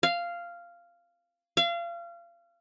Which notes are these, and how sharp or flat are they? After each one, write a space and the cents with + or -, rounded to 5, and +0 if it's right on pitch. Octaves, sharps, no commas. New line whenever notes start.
F5 -10
F5 -30